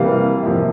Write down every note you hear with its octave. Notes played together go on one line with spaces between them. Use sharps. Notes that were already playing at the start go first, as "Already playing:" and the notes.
Already playing: C3 E3 G3 A#3 F5
C3 F3 A#3 E5